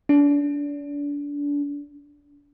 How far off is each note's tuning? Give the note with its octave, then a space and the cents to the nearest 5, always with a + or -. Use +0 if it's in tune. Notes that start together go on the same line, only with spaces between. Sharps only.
D4 -30